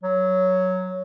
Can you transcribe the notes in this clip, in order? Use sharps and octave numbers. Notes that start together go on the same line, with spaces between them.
F#3